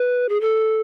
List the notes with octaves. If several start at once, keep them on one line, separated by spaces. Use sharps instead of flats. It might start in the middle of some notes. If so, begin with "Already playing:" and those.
Already playing: B4
G#4
A4